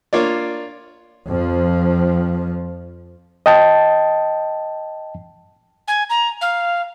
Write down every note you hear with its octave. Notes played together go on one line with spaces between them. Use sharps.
A#3 D4 F4 C#5 D5
F2 F3
D#5 G5 A5
G#5
A#5
F5